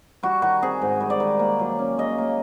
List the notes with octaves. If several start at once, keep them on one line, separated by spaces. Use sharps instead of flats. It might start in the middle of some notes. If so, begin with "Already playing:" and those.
G3 F#4
D#3 F#4
C4 G#4
G#2
G3
D5
D#3
A#3
F#3
C#4
C#3 D#5
A#3